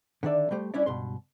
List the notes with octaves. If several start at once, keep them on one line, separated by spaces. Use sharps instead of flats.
D3 D#3 D4 D5 E5
G3 A3 G4 C5
G3 C#4 D4 E4 C#5 D5
C#2 G2 B2 C6